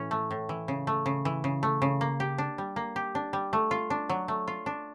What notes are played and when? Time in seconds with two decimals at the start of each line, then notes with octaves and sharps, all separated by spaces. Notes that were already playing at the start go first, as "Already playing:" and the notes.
Already playing: A2 E3 C#4
0.11 A3
0.31 A2
0.49 E3
0.68 C#3
0.87 A3
1.06 C#3
1.25 E3
1.44 C#3
1.63 A3
1.82 C#3
2.01 A#3
2.20 G4
2.38 D4
2.58 G3
2.76 A#3
2.96 G4
3.15 D4
3.33 G3
3.53 A3
3.71 F4
3.90 D4
4.09 F#3
4.28 A3
4.48 F4
4.66 D4